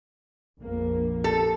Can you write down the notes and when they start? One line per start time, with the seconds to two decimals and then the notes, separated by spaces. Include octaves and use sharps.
0.59 A#1 F2 A#3
1.24 A4